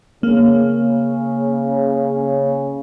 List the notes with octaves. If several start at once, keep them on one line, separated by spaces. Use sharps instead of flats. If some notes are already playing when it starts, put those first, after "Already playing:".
C#3 A#3